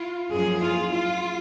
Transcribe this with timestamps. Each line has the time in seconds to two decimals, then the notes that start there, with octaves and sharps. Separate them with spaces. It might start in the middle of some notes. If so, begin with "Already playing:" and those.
Already playing: F4
0.31 F#2 F3 A#3 G#4
0.61 F4
0.90 F4